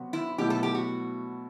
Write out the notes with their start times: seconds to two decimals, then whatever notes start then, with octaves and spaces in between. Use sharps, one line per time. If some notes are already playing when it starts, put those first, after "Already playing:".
Already playing: C3 F#3 B3 F#4
0.13 E4
0.38 B2 F#3 A3 E4 G4
0.50 A4
0.63 G4
0.75 F#4